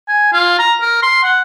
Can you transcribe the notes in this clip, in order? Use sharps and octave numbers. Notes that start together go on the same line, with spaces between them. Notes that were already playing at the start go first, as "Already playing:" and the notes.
G#5
F4
A#5
A#4
C6
F#5